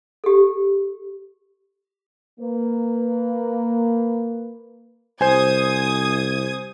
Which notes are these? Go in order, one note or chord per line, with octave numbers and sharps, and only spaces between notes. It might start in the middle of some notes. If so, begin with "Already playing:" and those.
G4 A4
A#3 B4
C2 C5 G#5 D#6 G#6